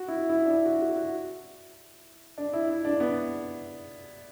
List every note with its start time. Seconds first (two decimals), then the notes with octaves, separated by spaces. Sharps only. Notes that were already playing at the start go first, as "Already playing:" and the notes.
Already playing: F#4
0.08 E4
0.29 E4
0.45 D4
0.50 E4
0.66 F#4
0.82 F#4
0.97 F#4
2.38 D4
2.53 E4
2.69 E4
2.85 D4
3.00 B3